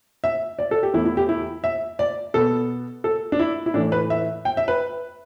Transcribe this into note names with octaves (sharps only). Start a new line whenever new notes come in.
E5
D5
A4
G4
E2 E3 A3 E4
E4
G4
E4
E5
D5
B2 B3 A4
A4
D4
E4
E4
A2 E3 A3 D4
B4
E5
G5
E5
B4